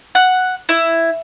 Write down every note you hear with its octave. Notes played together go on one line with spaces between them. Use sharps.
F#5
E4